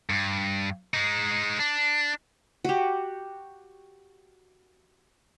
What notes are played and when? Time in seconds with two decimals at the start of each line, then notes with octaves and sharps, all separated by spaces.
0.10 G2
0.94 G#3 D#4
1.59 D4
2.65 F#4 G4